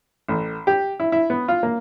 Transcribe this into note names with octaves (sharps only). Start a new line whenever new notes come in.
A1
G4
E4
E4
B3
F4
A#3